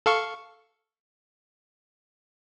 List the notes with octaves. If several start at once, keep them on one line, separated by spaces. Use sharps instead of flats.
A4 F5 C#6